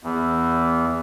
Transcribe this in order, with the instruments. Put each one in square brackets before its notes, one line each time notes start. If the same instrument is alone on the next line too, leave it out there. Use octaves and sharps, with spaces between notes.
[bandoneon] E2